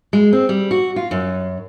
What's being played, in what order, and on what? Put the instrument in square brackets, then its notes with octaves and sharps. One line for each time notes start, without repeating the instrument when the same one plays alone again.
[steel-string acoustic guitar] G#3
C4
G3
F#4
F4
F#2